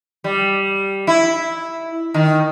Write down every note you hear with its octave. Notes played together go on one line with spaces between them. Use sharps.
G3
E4
D#3